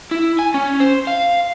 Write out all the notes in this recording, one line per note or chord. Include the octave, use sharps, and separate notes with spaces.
E4
G#5
C#4
C5
F5